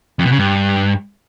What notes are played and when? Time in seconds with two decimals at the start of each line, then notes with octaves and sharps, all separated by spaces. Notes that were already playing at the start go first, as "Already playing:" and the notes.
0.19 F2
0.25 B2
0.32 C#3
0.38 G2